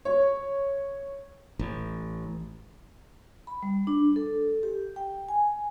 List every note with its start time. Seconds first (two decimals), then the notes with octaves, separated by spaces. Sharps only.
0.05 C#5
1.59 A1
3.47 B5
3.63 G3
3.87 D4
4.16 A4
4.63 G4
4.96 G5
5.29 G#5